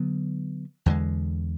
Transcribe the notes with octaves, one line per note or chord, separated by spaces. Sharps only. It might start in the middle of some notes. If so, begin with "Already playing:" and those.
Already playing: D3 F#3 B3
E2 D3 G#3